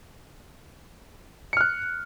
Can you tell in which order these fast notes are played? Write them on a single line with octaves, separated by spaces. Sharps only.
C#7 F6 F#6